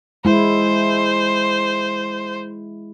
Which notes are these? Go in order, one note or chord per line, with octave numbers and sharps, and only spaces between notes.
G#3 E4 C5